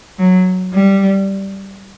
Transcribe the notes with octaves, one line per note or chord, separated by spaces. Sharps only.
F#3
G3